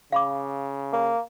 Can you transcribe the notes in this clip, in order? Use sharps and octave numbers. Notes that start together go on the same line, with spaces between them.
C#3 F5 B5 D6
A#3